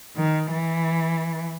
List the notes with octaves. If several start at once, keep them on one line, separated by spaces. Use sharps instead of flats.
D#3
E3